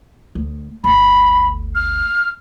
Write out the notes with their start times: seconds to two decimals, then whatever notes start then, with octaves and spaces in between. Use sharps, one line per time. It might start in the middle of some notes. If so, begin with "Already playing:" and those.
0.35 D2
0.84 G1 D2 B5
1.75 F6